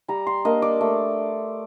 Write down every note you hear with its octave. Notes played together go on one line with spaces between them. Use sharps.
G3 A#5
C6
A#3 D4 D#5
D5
A3